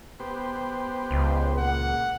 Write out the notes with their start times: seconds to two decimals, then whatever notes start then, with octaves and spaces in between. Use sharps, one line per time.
0.20 B3 G4 C5
1.11 C#2
1.58 A#2 F#5